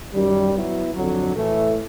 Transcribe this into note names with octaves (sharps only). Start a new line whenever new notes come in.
F#2 D#3 G3
F#3 B3 E4
F2 D3 F#3
A2 E3 A3